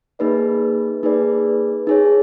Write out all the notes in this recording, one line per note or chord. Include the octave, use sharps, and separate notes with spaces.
A#3 D#4 G#4 B4 D5
A#3 D#4 G#4 B4 D5
D#4 G#4 C#5